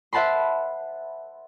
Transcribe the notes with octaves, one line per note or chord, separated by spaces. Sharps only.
C5 E5 F#5 A5 B5 C6